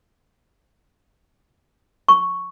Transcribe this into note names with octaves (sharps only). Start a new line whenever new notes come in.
C#6